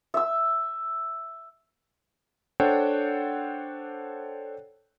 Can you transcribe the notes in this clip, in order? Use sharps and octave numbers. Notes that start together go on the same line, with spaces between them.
E5 E6
D4 A4 C5 C#5 F#5 G5